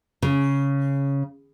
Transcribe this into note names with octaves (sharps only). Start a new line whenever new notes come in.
C#3